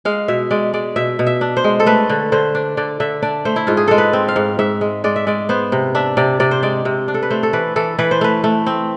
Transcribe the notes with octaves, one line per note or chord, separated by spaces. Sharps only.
G#3 F5
B2 E5
G#3 D5
G#3 D5
B2 E5
B2
E5
D4
C5
G#3
A4
A3 B4
D3
D3 C5
D4
D3 D5
D3 E5
D4 D5
A3 C5
E4
G#2 F4
G#4
G#3 A4
B4
C4
F5
G#2
G#2 E5
G#3
G#3 D5
E5
G#3 D5
B3 C5
C3
D4 E5
C3 D5
C3 D5
C5
G#3 D5
C3
D4
A4
B4
A3 C5
A4
E3 B4
E3 A4
E3 B4
C5
A3 B4
A3
C4